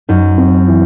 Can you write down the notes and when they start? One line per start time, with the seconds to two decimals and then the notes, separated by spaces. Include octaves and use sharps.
0.09 F#2 D#4
0.38 C4
0.68 E3